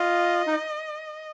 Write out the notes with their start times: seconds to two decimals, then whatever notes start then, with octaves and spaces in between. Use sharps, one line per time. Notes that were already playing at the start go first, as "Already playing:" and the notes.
Already playing: F4 D#5
0.47 D#4